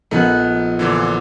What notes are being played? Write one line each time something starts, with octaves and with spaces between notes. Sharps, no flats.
A#1 A3 B3 D#4 F#6
A#2 D3 E3